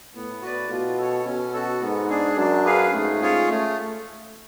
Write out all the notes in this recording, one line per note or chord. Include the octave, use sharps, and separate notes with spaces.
A2 B3
F#4 B4 D5
B2 F4
A4 C#5
B2 C#4
F#4 A4
G#2 B3
D4 G#4
F#2 D4
G#4 B4 F5
G#2 A3
C#4 F4 G#4 C#5
A3